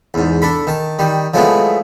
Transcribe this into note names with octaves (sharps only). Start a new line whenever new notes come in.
E2 G#2
D4 A4 B5
D#3 A5
D#3 G3
F3 F#3 G#3 A3 B3 E4